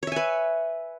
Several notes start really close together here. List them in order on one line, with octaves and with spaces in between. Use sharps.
C#5 E5 G#5 B4